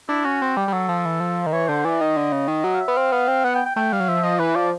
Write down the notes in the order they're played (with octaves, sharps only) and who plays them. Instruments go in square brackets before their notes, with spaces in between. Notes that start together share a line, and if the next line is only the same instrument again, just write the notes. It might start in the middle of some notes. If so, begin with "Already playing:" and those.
[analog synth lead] D4 [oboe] E4
[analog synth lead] C#4 [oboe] F#4
[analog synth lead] C4
[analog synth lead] G3 [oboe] G4
[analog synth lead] G3
[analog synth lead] F#3 [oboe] A4
[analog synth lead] F3
E3
F3
D#3
[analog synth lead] E3 [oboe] C#5
[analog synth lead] D3 [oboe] C5
[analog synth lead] E3 [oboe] D5
[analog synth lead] D#3 [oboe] D#5
[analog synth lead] D3
C#3
D#3
F#3
[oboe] F5
E5
[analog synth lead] B3
[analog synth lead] C4 [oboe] F5
[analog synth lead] B3 [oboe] F5
[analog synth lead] C4
[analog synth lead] B3 [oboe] F#5
[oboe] G5
G5
[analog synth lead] A3 [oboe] G5
[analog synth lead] G3 [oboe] F5
[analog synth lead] F#3
[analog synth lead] F3 [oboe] E5
[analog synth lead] F3 [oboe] D#5
[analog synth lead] E3 [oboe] B4
[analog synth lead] F3 [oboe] D5